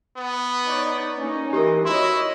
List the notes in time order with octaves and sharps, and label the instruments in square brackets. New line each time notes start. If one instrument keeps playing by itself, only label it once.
[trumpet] B3
[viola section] D#4 C#5 D5
A#3 C#4 D#4
[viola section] E3 [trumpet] D#4 [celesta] G4 A#4
[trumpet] E4 [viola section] F#4 C#5 D#5 [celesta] C6